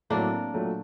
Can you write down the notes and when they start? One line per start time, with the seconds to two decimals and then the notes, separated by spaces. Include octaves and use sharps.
0.10 A2 F#3 A#3 C4 D4
0.54 A#2 F#3 A3